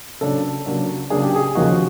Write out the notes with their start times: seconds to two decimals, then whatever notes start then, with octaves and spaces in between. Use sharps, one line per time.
0.21 C#3 F#3 A#3 D4 A4
0.66 C#3 F#3 A#3 D4
1.10 C#3 F#3 A#3 D4 G#4
1.24 G4
1.36 G#4
1.55 D#2 C#3 F3 A#3 D#4 F#4